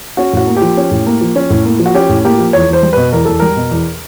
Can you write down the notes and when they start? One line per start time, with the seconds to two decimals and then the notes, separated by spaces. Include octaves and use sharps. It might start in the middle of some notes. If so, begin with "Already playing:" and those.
0.17 C#4 F#4
0.33 A2 F#4
0.47 A#3
0.57 G4
0.62 F3
0.77 C#4
0.91 A2
1.07 A#3
1.21 F3
1.36 C#4
1.50 A2
1.65 A#3
1.79 F3
1.86 F#4
1.95 C#4 G4
2.09 A2
2.25 A#3 G4
2.39 F3
2.53 E2 C#5
2.68 E2 C5
2.83 G3
2.93 B2 B4
3.13 E2 A#4
3.25 E2 A4
3.40 G3 A#4
3.57 B2
3.71 E2